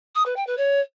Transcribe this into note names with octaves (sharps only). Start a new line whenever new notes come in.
D#6
B4
G5
B4
C#5